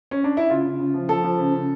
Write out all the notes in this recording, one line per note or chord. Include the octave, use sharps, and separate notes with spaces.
C#4
D4
E4
C#3 F4
C#3
C#3
F3
F3 A4
F3
C#3
C#3